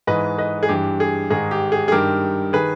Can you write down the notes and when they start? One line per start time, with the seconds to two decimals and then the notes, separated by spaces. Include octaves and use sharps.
0.07 G#2 E3 B4 D#5
0.38 B4 D#5
0.63 G#4
0.69 G2 E3 G4
1.00 G#4
1.30 G#2 D#3 G#4
1.51 G4
1.72 G#4
1.88 G#4
1.92 G2 D#3 G4 A#4
2.53 D#3 G#4 B4